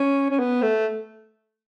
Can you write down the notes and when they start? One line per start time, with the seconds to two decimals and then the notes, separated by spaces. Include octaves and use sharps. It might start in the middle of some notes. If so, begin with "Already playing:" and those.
Already playing: C#4
0.30 C#4
0.39 B3
0.62 A3